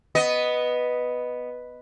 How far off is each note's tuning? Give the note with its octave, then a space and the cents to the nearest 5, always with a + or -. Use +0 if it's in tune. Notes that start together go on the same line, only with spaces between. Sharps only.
B3 +0 D#5 +0